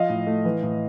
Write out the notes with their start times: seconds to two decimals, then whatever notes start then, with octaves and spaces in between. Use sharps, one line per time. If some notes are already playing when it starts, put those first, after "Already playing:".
Already playing: F3 D#5 F5
0.09 A2
0.27 A3
0.45 E3
0.63 A2